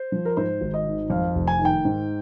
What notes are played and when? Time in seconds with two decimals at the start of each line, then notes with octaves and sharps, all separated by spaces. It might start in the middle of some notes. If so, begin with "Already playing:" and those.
Already playing: C5
0.12 F3
0.25 A#4
0.37 G#2 C5
0.61 G#1
0.74 D#5
0.86 D#3
1.10 F2 F5
1.35 F1
1.47 G#5
1.59 D#3
1.65 G5
1.85 G#2